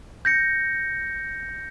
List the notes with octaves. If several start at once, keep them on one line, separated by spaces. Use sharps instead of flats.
G6 A#6 C#7